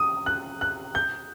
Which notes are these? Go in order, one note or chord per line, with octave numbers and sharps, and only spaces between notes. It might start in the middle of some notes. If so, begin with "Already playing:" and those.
Already playing: D#6
F#6
F#6
G6